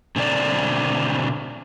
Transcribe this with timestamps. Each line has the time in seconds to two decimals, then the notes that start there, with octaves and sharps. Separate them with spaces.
0.16 B2 D3 C4 D5